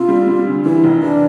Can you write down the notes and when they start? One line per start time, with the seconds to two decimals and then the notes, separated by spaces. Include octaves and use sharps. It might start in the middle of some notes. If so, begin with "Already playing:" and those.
Already playing: C3 F4
0.08 G3
0.27 G3
0.47 D2
0.65 E3 E4
0.84 F1
1.02 E3 D4